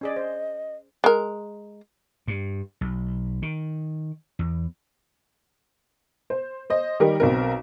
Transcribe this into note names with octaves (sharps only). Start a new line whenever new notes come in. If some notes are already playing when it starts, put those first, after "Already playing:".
C#4 G#4 D5 D#5
C5
G#3 A#4
G2
B1
D#3
E2
C5
C5 D#5
D#3 G3 D#4 G4 A#4
B1 C4 A#4